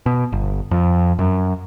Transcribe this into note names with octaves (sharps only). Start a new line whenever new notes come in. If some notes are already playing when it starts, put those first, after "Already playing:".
B2
G1
F2
F#2